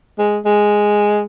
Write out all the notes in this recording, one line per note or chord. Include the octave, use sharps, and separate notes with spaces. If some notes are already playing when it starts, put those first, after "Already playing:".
G#3
G#3